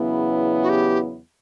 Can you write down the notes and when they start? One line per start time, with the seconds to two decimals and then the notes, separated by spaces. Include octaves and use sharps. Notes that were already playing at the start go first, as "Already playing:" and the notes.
Already playing: E2 C#3 F#3 B3 E4
0.63 F#4
0.69 G4